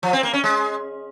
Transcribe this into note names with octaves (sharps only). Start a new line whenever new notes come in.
F3
C4
A#3
C#4
G#3